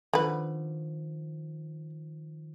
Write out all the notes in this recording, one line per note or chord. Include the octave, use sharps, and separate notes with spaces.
D3 D#3 F3 B4